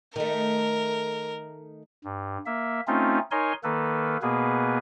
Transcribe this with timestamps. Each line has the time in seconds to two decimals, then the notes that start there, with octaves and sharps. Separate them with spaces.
0.16 D#3 A3 A#4
2.04 G2
2.46 A#3 E5
2.88 A3 C4 C#4 D#4 F4
3.31 D#4 A#4 C#5 G#5 C6
3.64 D#3 A#3 A4 B4
4.22 B2 A#3 B3 G#4 B4